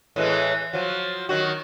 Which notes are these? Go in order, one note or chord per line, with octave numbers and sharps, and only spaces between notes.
A2 E3 G#3
F3 F#3
D#3 F#3 F#4